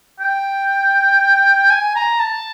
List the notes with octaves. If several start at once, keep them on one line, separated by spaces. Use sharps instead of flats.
G5
G#5
A#5
A5